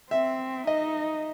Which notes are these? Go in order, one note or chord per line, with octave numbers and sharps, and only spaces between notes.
C4 E5
D#4 D#5